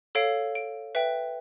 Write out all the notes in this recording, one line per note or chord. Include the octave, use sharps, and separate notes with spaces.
A4 C#5 F5 D7
D7
B4 E5 G5